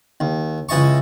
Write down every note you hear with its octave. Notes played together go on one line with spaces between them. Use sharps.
D#2
C#2 E3 D#5 A5 C#6